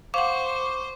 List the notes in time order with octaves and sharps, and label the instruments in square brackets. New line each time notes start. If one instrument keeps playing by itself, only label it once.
[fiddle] C5 [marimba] F5 F#5 [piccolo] C#6 [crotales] D6